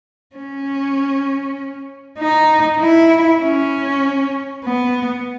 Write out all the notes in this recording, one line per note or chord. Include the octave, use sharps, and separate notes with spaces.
C#4
D#4
E4
C#4
B3